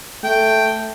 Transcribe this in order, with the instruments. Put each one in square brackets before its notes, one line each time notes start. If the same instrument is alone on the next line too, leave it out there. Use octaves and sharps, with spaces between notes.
[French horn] A3 [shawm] G5